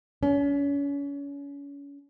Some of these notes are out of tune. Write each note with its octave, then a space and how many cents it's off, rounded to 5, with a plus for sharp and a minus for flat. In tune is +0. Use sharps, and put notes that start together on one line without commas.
C#4 +35